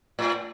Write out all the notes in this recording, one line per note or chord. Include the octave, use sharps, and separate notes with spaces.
A2